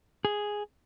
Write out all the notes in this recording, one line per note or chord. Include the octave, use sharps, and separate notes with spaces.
G#4